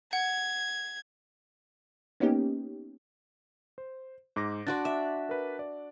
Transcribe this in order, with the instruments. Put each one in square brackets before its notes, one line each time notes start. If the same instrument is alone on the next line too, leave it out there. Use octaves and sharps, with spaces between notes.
[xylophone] F#5 [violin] G#6
[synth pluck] A#3 B3 C#4 D#4 G4
[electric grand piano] C5
G#2 D6 A#6
[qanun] D4 F#4 D5 [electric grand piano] C6 F#6 A6
[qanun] E5
[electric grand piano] A#4 B4
D5